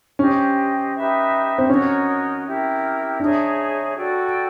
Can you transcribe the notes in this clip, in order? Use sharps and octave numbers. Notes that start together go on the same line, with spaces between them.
C#4 G4 C5 D#5
D#4 G4 B4 E5
C4
C#4 D#4 F#4 A#4 C#5
E4 G4 A#4
D4 D#4 G#4 C#5 E5
F#4 A4 D5 G5